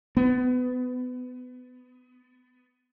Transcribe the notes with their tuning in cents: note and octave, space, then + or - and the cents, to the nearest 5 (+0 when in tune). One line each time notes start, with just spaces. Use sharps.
B3 +25